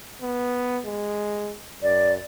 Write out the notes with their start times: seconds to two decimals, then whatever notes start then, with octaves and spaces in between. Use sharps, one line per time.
0.22 B3
0.85 G#3
1.82 F#2 D5